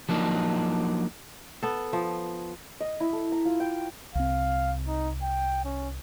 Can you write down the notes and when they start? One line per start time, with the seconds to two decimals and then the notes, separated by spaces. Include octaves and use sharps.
0.09 F3 F#3 A#3 D4 D#4
1.63 B3 A4
1.93 F3
2.81 D#5
3.00 E4
3.13 A4
3.32 A#5
3.45 F4
3.60 G5
4.15 C2 C4 F5
4.87 D#4
5.22 G5
5.65 C#4